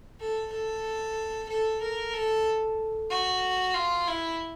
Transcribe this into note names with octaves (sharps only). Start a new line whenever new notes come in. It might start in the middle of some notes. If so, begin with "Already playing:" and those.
A4
A4
A4
A#4
A4
F#4
F4
E4